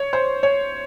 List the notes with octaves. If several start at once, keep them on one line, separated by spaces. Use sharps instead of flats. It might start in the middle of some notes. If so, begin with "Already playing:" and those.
Already playing: C#5
C5
C#5